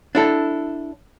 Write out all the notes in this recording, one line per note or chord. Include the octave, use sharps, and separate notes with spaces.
D4 E4 A4